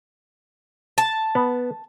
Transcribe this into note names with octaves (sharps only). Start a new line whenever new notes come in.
A5
B3